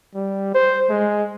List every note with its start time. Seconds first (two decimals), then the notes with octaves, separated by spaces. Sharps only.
0.15 G3
0.54 C5
0.90 G#3